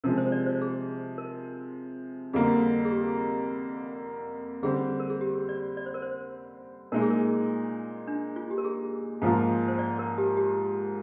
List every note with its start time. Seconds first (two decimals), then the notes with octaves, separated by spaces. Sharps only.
0.04 C3 F3 G#3 A#4
0.18 C5
0.32 D5
0.46 C5
0.62 G#4
1.18 A#4
2.33 F2 D3 G3 A#3 G#4
2.85 G#4
2.91 G4
4.63 D3 G3 C4 G#4
5.00 A#4
5.10 G#4
5.21 G4
5.49 D5
5.77 D5
5.86 C5
5.94 A#4
6.02 C5
6.92 A#2 G#3 D#4 A#4
7.02 G#4
7.10 A#4
8.07 D4
8.36 F4
8.51 G4
8.58 A#4
8.65 G#4
9.22 G#2 F3 A#3 F4
9.68 C5
9.79 D5
9.99 A#4
10.18 G4
10.37 G4